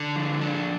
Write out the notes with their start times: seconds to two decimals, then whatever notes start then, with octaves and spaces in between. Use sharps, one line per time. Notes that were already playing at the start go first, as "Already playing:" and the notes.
Already playing: D3
0.16 F3
0.41 D4